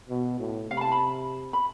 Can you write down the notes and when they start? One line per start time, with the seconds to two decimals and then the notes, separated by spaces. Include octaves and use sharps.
0.09 B2
0.39 A2
0.71 C3 F5
0.77 B5
0.81 A5
0.92 B5
1.53 B5